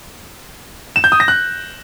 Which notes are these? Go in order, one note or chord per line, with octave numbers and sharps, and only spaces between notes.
E7
G6
D#6
A#6
F#6